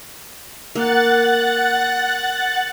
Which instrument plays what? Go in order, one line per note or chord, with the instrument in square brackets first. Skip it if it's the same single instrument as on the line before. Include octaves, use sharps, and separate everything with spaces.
[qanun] A#3 [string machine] F#5 F#6 A6